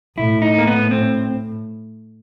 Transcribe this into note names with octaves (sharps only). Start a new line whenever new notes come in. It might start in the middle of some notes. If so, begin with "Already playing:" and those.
A2 E4
D#4
A#3
B3
C4